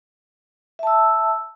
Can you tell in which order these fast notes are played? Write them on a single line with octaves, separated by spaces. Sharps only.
E5 A5 E6